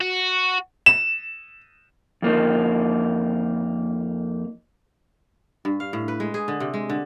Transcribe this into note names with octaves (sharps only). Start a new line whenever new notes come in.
F#4
E7
F2 A#3 D#4
G2
F5
A2
B4
G#3
G#4
D3
C3
G#3
D3